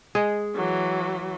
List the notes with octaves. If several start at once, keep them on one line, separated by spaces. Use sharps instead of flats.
G#3 G#4
E3 F#3